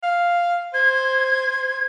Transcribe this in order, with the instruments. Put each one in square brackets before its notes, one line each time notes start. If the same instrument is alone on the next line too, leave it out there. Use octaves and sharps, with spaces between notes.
[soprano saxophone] F5
[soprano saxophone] C5 [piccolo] G#6